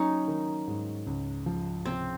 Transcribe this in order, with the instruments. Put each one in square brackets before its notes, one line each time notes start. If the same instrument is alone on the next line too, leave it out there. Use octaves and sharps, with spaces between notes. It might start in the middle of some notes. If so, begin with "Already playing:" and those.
Already playing: [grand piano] F#3 A#3 [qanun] C#4 D#4
[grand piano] D#3
G#2
C#2
F3
[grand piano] C3 [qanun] C4